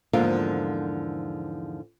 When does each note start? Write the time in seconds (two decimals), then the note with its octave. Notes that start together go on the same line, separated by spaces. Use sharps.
0.13 E2 G#2 D3 F3 A#3 F4